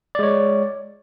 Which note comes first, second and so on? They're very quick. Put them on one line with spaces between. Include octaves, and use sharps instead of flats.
D5 G#3 C#5